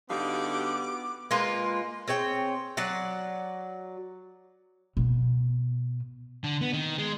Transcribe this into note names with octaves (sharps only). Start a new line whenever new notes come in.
D3 G3 B3 D#4 F#4 G4 F5 D6
G#3 A#3 F4 B4
C4 G#4 C#5 G5
F#3 D5 F#5
B2
D3
B3
D#3
G#3